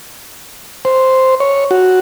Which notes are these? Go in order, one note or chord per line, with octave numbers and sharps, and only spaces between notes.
C5
C#5
F#4